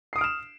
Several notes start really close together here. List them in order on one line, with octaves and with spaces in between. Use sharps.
C7 D#6 D7 F6 E7